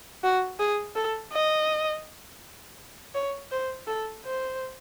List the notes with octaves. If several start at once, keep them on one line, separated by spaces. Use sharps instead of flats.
F#4
G#4
A4
D#5
C#5
C5
A4
C5